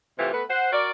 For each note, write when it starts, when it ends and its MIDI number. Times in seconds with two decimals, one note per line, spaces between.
0.18 0.29 48
0.18 0.29 52
0.18 0.29 57
0.18 0.29 65
0.18 0.29 67
0.33 0.43 57
0.33 0.43 59
0.33 0.43 71
0.49 0.69 72
0.49 0.69 78
0.72 0.91 66
0.72 0.91 70
0.72 0.91 74